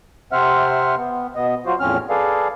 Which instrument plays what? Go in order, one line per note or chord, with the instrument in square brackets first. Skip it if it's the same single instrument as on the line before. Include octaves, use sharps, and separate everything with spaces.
[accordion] C3 C4 C5 E5 F#5 F6
B3
B2 B3 D#5
F#3 F4 F#4 C5
E2 A2 F3 C4 C#4 F6
G#4 A4 B4 D5 F5